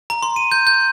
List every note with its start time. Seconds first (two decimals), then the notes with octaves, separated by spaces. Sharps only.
0.10 A#5
0.23 C6
0.36 D#7
0.52 G6
0.67 G6